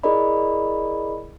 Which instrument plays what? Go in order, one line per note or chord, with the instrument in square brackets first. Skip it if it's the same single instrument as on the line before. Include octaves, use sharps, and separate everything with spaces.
[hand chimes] E4 G#4 A#4 D5 D#5 B5